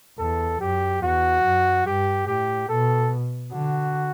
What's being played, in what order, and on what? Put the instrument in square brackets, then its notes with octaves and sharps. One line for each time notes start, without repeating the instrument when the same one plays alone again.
[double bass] E2 [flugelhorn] A4
[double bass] F#2 [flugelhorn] G4
[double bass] E2 [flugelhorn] F#4
[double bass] F#2
[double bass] G2 [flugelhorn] G4
[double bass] A2 [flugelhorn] G4
[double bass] B2 [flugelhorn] A4
[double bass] D3 [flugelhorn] F#4